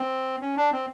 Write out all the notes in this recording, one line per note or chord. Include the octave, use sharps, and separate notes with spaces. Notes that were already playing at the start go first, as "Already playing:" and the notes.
Already playing: C4
C#4
D4
C4